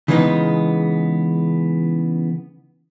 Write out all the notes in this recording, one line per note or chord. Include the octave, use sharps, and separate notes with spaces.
C#3 E3 G#3 B3 D#4